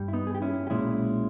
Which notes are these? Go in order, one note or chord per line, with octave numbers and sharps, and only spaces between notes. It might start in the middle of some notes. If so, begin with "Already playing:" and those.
Already playing: G2 G3
E4
B3 D#4
G#4
G4
C#4 E4
G4
B1 A#2 G#3 C#4 E4